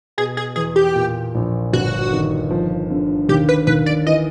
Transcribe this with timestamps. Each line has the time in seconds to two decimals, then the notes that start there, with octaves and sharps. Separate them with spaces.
0.18 B2 G#4
0.37 G#4
0.56 E2 G#4
0.76 G4
0.95 A#2
1.35 A#1
1.73 G1 F#4
2.12 D#3
2.50 F3
2.90 D3
3.29 D#2 G4
3.49 B4
3.67 D#2 B4
3.86 D5
4.06 E3 D#5